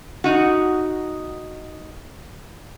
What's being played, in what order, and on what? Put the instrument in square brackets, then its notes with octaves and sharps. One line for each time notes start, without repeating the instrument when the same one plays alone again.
[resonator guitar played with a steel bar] D#4 F#4